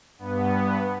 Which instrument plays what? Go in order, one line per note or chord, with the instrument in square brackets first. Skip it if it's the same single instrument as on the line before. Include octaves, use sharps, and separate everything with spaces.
[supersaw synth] G2 B3